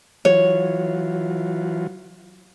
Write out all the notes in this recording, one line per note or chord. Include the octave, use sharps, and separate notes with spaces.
E3 F#3 F4 C#5